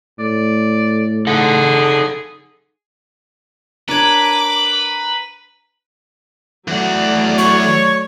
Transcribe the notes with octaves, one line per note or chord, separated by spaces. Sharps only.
A2 D5
D#4 G#4 A4 F#5
D4 A#4 B4 C#5 D6
E3 F#3 A3 D5 F#5
C#5 C#6